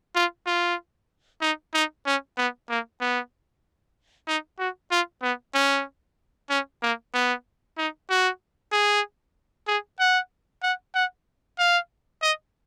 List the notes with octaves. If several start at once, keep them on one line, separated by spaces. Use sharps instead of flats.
F4
F4
D#4
D#4
C#4
B3
A#3
B3
D#4
F#4
F4
B3
C#4
C#4
A#3
B3
D#4
F#4
G#4
G#4
F#5
F#5
F#5
F5
D#5